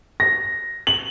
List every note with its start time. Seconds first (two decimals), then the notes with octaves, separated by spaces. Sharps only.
0.20 A#6
0.87 F#7